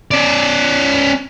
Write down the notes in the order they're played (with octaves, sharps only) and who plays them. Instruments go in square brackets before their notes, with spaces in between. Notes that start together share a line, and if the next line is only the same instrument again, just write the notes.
[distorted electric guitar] C#4 D5